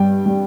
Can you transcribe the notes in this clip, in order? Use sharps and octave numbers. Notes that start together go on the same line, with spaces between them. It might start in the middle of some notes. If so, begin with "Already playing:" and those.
Already playing: G2 G3 G5
G3